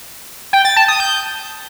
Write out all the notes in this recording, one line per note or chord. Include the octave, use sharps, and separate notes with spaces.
G5
A6
A5
D#6
G6